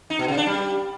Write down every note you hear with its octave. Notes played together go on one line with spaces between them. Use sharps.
D#4
B2
C#3
D4
G3